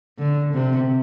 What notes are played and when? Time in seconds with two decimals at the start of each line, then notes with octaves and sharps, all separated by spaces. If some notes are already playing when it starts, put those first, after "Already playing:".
0.19 D3
0.53 C3